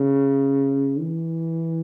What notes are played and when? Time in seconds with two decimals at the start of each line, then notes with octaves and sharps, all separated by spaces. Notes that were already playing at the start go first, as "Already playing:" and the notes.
Already playing: C#3
1.00 E3